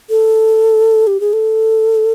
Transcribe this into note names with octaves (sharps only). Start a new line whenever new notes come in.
A4
G4
G#4
A4